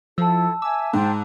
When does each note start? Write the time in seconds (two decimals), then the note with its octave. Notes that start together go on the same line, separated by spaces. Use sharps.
0.18 F3 E4 A4 A5 E6
0.62 E5 G#5 D6 E6
0.93 G#2 C5 G5 A5